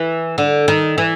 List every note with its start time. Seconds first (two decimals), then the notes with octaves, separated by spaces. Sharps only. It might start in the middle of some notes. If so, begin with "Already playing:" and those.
Already playing: E3
0.38 D3
0.68 D#3
0.98 E3